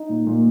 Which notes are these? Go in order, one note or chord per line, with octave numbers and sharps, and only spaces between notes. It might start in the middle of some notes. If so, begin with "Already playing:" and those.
Already playing: D#4
A#2
A#2